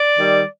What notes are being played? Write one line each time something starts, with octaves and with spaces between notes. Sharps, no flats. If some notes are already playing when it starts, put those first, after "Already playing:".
Already playing: D5
D#3 G3